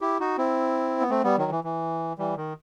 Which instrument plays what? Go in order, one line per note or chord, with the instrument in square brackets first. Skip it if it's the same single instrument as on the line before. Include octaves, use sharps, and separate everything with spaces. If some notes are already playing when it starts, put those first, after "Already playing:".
[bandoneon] E4 G4
D#4 F#4
C4 E4
B3
A3 C4
G3 B3
D#3 F#3
E3
E3
E3 G3
D#3